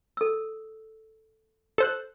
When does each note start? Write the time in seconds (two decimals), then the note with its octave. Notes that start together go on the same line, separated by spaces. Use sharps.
0.17 A4 E6
1.78 A4 C5 F#6